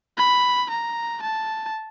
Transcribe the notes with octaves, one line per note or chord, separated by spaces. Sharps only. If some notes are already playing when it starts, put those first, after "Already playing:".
B5
A#5
A5